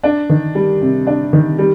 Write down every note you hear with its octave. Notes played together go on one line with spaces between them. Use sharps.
D4
D#3
G3
C3
D4
D#3
G3